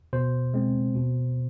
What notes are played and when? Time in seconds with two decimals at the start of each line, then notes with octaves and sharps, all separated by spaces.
0.13 B2 C5
0.54 G#3 C4
0.95 B2